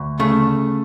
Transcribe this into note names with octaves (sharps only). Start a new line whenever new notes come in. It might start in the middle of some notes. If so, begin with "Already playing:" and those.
Already playing: D2
C#3 A3